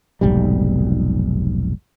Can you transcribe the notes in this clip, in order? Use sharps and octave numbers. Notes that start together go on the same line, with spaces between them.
F1 B1 G#2 G3